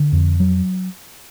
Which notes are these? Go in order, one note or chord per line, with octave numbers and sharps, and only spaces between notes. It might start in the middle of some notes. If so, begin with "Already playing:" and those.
Already playing: D3
F2
F#3